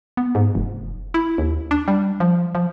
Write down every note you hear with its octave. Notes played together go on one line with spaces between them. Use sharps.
B3
G#2
F1
E4
D#2
D4
G3
F3
F3